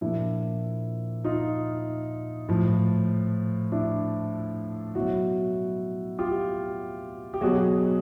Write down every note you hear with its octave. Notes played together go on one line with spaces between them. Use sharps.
A#2 F3 D4 E4
D#4 F4
A2 F3
D4 E4
B2 F#3 E4 F#4
F4 G4
G4
B2 F#3 F#4 G#4